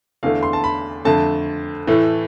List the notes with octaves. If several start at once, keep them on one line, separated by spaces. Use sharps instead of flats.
E2 D3 A3 F5
C6
A5
B5
F2 D3 A3 A5
A2 E3 A3